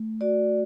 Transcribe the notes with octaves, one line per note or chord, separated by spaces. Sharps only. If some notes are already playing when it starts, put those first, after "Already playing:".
Already playing: A3
F#4 D5